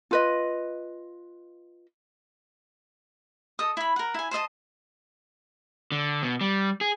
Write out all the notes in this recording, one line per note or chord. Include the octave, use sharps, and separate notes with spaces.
F4 B4 D#5
A4 D#5 D#6
E4 B5
A#4 F#5
E4 G#5
C5 D5 D#5 A5
D3
B2
G3
G#4